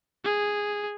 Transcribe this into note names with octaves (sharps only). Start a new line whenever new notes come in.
G#4